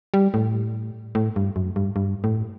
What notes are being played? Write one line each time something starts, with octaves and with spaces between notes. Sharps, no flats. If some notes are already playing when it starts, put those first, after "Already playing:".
G3
A2
A2
G2
F#2
G2
G2
A2